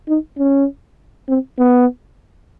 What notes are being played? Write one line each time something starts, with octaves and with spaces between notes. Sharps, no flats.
D#4
C#4
C4
B3